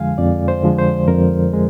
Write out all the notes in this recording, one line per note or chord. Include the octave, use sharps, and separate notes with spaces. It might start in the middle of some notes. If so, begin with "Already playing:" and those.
Already playing: F2 D3 F3 G#3 F5 G#5
F2 D5
C5
D3 F3 G#3
C5
F2 A#4
G#3